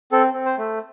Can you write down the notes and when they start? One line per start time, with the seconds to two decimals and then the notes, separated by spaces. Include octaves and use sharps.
0.12 C4 A4
0.34 C4
0.45 C5
0.58 A3